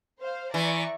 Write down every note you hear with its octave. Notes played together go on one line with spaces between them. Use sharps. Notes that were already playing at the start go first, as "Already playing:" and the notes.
C5 F5
E3 D5 A#5 C#6